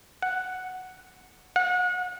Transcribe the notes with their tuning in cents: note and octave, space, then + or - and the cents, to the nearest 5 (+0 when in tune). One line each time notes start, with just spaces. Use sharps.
F#5 +0
F#5 -35